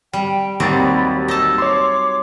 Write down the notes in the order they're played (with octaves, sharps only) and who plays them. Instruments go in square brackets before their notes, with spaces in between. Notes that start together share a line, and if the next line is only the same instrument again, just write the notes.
[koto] G3 [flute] G5
[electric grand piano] D#2 A6 [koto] F#3 G3 C4
[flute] B5
[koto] D#4 A5 [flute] E6
[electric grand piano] C#5 C6 [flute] D6